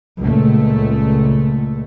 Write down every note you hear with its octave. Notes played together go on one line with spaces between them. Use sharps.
C#2 A#2 A3